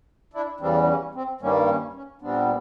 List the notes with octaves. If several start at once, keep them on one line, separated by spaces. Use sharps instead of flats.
D4 E4
E2 C#3 E3 G3 C4 D4
C#4
C4
G2 D#3 G3 A#3 C#4
C#4
C#4
A#2 G3 B3 C4 D4